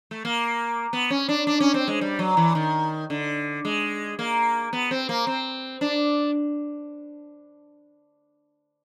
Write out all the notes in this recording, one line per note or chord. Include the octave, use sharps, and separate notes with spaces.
A3
A#3
B3
C#4
D4
D4
C#4
C4
G#3
G3
F#3
E3
D#3
D3
G#3
A#3
B3
C4
A#3
C4
D4